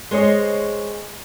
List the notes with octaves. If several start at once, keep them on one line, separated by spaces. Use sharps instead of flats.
G#3 C5 C#5 D#5